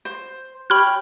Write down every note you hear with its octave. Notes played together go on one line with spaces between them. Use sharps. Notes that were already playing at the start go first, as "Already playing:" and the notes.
C5
G4 C#5 G#5 B5 F6